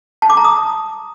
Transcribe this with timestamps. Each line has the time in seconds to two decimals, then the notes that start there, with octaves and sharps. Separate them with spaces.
0.22 A5
0.30 D6
0.37 A#5
0.44 D#6